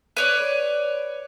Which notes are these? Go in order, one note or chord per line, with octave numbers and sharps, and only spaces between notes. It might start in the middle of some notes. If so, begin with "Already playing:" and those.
B4 C#5 D5